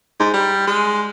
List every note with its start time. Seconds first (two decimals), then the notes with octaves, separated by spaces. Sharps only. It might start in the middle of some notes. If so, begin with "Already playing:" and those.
0.20 G#2
0.34 G3
0.67 G#3